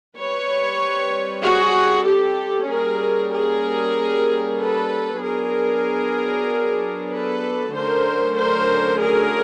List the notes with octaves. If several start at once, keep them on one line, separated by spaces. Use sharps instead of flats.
G3 C4 B4 C#5
F#4 G#4
G4 A4
G3 A#3 C#4 G#4 A#4
G#4 A#4
A4 B4
F#3 B3 D4 G#4 A#4
A4 B4
D3 F#3 A3 C#4 A#4 C5
A#4 C5
G#4 A#4